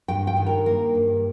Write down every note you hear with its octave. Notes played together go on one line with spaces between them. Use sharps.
G2 G5
G5
D#3
A#4
A#3 A#4
G2